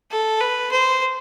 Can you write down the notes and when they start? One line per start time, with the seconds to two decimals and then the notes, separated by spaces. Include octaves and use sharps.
0.11 A4
0.41 B4
0.71 C5